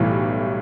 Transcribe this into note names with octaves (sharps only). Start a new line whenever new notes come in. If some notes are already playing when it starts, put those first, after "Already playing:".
Already playing: B1 A2 E3 G3